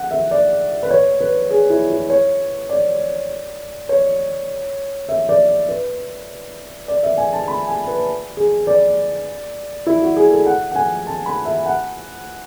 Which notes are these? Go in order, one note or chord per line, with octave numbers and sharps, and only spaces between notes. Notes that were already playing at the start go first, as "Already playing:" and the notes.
Already playing: F#5
E5
D5
B4
C#5
B4
G#4
E4
E4
C#5
D5
C#5
E5
D5
B4
D5
E5
G#5
A5
B5
G#5
B4
G#4
D5
E4
F#4
G#4
A4
F#5
F#5
G#5
A5
B5
E5
F#5